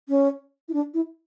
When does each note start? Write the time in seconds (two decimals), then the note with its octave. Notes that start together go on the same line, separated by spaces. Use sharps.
0.09 C#4
0.68 E4
0.73 D4
0.94 E4